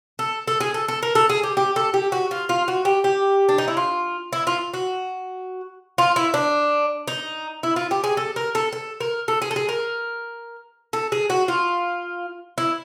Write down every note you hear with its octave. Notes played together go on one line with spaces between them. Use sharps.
A4
A4
G#4
A4
A4
A#4
A4
G#4
G4
G4
A4
G4
F#4
F4
F4
F#4
G4
G4
D4
D#4
E4
F4
E4
F4
F#4
F4
E4
D4
D#4
E4
F4
G4
G#4
A4
A#4
A4
A4
A#4
A4
G#4
A4
G#4
A#4
A4
G#4
F#4
F4
E4